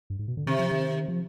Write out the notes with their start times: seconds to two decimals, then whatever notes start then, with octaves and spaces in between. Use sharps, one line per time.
0.10 G2
0.19 G#2
0.28 B2
0.37 D3
0.46 C3 D#3
0.59 F3
0.71 D#3
1.08 F3